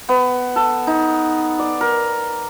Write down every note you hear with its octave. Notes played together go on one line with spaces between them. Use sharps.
B3
A4
D#4
D5
A#4